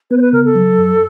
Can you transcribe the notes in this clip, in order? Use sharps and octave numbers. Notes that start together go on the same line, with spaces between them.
B3 B4
C5
B4
C#3 A#4
A4
F#3
F#2